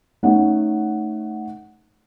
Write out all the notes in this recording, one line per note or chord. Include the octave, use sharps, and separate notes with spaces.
A3 C#4 D#4 F#5